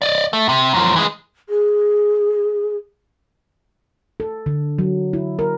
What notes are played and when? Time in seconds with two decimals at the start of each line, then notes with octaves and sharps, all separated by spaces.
0.02 D5 D#5
0.33 A3
0.49 C3
0.74 F#2 F3
0.96 E3 G#3
1.49 G#4
4.20 A4
4.46 D3
4.79 F#3
5.13 E4
5.39 A#4